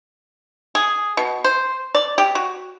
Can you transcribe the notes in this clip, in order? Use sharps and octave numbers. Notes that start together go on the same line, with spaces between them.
G#4
B2
C5
D5
G4
F#4